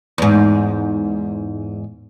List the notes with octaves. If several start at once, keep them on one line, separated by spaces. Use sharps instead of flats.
E2 G#2